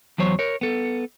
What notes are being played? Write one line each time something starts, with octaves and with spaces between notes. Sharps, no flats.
E2 F#3 C5 C#5
A#4 C#5
B3 A4